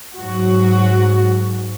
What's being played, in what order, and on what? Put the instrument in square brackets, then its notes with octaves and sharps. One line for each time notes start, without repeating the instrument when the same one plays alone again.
[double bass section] G#2 [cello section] F#3 F#4